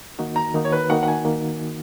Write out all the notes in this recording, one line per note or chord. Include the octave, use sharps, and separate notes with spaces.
D#3 A#3 D#4 F#4
A#5
D#3 A#3 D#4 F#4
C#5
B4
D#3 A#3 D#4 F#4 F#5
F#5
G#5
D#3 A#3